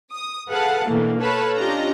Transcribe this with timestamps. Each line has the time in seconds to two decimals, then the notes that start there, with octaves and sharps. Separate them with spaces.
0.13 D#6
0.50 G#4 A4 B4 F5 F#5 A5
0.87 B2 D3 E3 A3 A#3
1.21 A4 B4 C#5 F5 A5 B5
1.57 C#4 D4 F4 G4 D#5 A#5